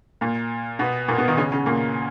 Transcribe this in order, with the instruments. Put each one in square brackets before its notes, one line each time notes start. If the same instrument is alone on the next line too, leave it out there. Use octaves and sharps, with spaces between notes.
[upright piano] A#2 A#3
B2 B3
A#2 A#3
B2 B3
D#3 D#4
C#3 C#4
C#3 C#4
A#2 A#3